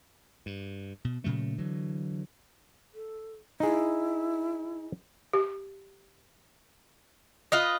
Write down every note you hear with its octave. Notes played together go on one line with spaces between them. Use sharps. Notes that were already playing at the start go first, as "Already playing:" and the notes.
G2
B2
A#2 C#3 F#3 A3
D3 E3 F#3
A4
D#4 E4 G#4
G4
F4 B4 D#5